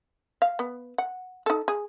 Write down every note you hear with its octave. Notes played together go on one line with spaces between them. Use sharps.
F5
B3
F#5
D#4 A4
G#4